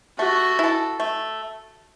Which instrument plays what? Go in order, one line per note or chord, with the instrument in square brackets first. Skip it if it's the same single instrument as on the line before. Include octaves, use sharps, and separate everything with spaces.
[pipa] A3 [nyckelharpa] F#4
[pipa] E4 A4
A3